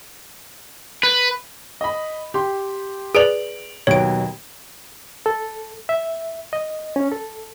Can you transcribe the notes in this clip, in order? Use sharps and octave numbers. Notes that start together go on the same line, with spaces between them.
B4
D#5 B5
G4 C6
G#4 B4 D5 D7 F7 F#7
D#2 B2 F#3 C#5 D7
A4
E5
D#5
C#4
A4